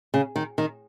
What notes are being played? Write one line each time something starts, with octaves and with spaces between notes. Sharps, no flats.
C#3
D#3
D#3